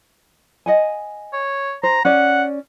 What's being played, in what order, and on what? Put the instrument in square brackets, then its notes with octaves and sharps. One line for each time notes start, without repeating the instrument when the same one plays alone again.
[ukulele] D#5 F#5 G#5
[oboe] C#5
[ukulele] C5 [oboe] A#5
[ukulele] C#4 D5 [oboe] F#5